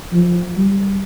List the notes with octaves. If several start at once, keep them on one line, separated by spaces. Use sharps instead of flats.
F3
G3